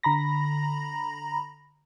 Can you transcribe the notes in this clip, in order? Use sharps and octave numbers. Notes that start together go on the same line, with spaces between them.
D3 A#5 B5 A#6